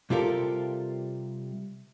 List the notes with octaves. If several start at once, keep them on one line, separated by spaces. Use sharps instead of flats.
C3 G3 F4 G4 A4 A#4